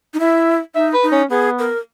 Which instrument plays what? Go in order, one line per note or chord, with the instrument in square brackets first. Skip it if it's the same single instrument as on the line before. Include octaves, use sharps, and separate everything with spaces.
[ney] D#4
[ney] E4 [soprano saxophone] E5
[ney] D#4 [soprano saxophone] E5
[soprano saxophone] B4
[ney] D#4
[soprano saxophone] C#4
[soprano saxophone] B3 [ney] G#4
[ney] A#4